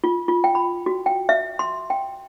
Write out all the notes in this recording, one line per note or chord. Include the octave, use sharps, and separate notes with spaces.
F4
F4
G5
B5
F#4
G5
E5
C6
G5